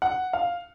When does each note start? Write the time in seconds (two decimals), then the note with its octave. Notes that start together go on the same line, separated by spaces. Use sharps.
0.02 F#5
0.33 F5